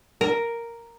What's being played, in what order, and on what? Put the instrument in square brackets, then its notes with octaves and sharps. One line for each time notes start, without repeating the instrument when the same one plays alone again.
[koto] A#4